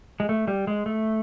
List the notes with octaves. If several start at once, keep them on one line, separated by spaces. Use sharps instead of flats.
G#3
A3
G3
G#3
A3